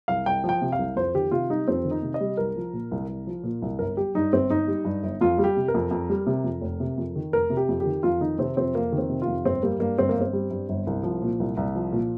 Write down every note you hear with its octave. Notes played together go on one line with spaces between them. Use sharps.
C2 F5
C2 G5
F3
G5
C3
F5
C2
F2 C5
D#3 G4
C3 F4
G3 D#4
F2 C4
D#3
D#4
C3
D#5
G3
C2 A#4
F3
A#2
C2
C2
F3
A#2
C2
G1 A#4
G3 G4
G2 D#4
G1 C4
G1 D#4
G3
G2
G1
F2 F4
G3
G4
C3
A#4
F2
F2
G3
C3
F2
F1
C3
F2
D#3
F1 A#4
C3
G4
F2
G4
D#3
F2 F4
D#3 D#4
C3 C4
F2 C4
F2 A#3
D#3
C4
C3
F4
F2
G1 C4
G3 A#3
G2 A#3
G1 C4
A#3
G1
C4
G3
G2
G1
C2
F3
A#2
C2
C2
F3
A#2